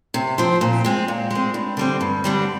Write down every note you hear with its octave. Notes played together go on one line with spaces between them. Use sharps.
C3
F3 C4
A#2
G#3 C4
A#2
G#3 C4
G2
D3 G3 C4
G2
D3 G3 C4